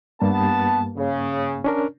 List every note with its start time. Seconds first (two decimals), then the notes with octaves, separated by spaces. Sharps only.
0.21 G2 A#3 B3 A5
0.97 C#3
1.64 C#4 D4 A#4